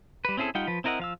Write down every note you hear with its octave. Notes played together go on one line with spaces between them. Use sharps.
G3 B4
C4 C#4 E4 G#4 A4
G3 D#4 F4 F#5 G5
F3 B4
C4 E4 A#4 D#5 F#5
F3 F5 E6